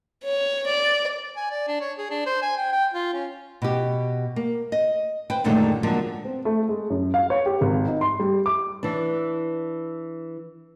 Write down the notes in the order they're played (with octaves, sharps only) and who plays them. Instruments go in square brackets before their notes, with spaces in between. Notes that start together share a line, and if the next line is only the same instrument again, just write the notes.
[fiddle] C#5
D5
[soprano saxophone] G#5
D5
D4
C#5
G#4
D4
C5
G#5
G5
G5
F4
C#4
[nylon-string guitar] B2 G4
A#3
D#5
B4 C5 G5
F#2 A#2 D3 D#3 G#3 A3
D3 F3 F#3 G#3 A#3 D4
[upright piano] C4
A3
G#3
F#2
F5
C#5
G4
G#1
D#4
C6
G3
D6
[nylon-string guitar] E3 D4